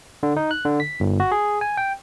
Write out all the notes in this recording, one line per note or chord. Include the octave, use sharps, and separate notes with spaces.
D3
D#4
F#6
D3
B6
G1
F#4
G#4
G#5
G5